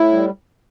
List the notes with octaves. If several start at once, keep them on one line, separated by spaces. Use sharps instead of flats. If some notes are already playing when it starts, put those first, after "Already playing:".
Already playing: A2 E4
G3